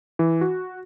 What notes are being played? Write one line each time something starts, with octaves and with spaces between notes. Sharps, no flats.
E3
F#4